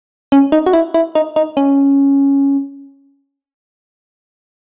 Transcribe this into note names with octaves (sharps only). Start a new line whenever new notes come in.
C#4
D#4
F#4
E4
E4
D#4
D#4
C#4